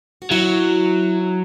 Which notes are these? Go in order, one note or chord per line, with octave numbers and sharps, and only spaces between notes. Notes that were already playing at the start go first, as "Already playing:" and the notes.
F#4
F#3 E4